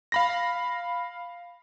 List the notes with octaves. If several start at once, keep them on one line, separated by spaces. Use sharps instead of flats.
F5 B5 A#6